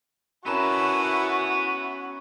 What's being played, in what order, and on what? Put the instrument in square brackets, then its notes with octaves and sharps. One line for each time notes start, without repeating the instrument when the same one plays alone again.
[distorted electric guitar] B3 A5 [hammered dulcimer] C#4 A#4 B4 [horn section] E4 [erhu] F#4